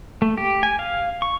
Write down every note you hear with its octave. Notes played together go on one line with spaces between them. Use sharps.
A3
G4
G#5
F5
C#6